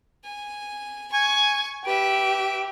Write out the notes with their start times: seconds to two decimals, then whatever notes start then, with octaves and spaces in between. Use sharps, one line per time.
0.24 G#5
1.12 G#5 C#6
1.85 G4 B4 E5 D7